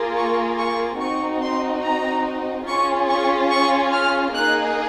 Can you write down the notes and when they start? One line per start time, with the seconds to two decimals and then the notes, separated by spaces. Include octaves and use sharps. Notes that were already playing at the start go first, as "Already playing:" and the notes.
Already playing: A#3 F4 G#4
0.17 C#6
0.58 C#6
1.00 C4 D#4 F#4 C#6
1.42 C6
1.83 A#5
2.67 C#4 F4 G#4 C#6
3.09 C#6
3.50 C#6
3.92 F6
4.34 A#3 D#4 G#4 F#6